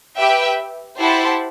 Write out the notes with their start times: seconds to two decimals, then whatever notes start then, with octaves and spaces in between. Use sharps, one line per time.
0.17 G4 B4 E5 G5
0.99 E4 G4 C5 F#5 A5